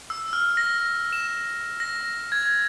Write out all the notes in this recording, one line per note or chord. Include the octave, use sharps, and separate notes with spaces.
E6
F6
A#6
E7
A#6
G#6